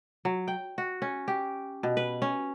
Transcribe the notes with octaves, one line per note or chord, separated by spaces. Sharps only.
F#3
G5
F#4
C#4
G4
B2
B4
C#4